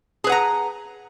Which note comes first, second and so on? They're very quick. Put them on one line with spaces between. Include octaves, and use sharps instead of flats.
G#4 B4 F#5 A#5